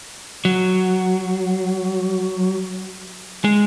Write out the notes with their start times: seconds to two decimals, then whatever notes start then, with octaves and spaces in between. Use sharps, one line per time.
0.45 F#3
3.45 G#3